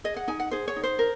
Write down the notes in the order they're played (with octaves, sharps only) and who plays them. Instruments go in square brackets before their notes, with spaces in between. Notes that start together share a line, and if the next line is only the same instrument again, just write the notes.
[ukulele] G#4 D#5
F#5
D#4 G#5
F#5
G#4 C5
C#5
D#4
C5
A#4